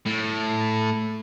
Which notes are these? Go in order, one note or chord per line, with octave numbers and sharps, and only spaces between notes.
A2